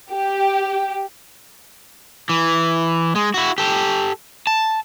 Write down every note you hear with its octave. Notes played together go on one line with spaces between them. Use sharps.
G4
E3
G#3
E4 F#4
G4 A4
A5